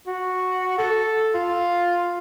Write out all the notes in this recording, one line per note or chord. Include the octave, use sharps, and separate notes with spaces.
F#4
A4
F4